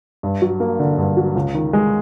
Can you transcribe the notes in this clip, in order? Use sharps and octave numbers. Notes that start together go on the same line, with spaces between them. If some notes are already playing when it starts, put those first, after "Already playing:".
G2
F#3
A#3
D3
G2
F#3
C#2
D#3
G#3